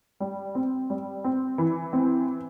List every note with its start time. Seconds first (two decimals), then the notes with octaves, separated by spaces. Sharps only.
0.20 G3
0.55 C4
0.90 G3
1.24 C4
1.58 E3
1.93 C4